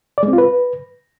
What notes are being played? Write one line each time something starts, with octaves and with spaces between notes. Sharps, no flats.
D5
G#3
C4
F4
B4